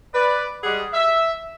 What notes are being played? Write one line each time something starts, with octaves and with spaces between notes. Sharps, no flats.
B4 D5
G3 G#3 G#4 F#5
E5